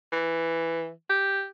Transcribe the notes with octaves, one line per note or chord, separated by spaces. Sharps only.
E3
G4